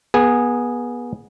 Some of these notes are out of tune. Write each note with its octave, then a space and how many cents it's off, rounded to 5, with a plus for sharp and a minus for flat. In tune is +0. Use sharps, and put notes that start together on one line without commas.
B3 -25 G#4 +0